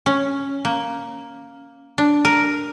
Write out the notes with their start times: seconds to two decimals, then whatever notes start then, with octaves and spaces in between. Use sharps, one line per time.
0.06 C#4
0.65 A#3
1.98 D4
2.25 A#4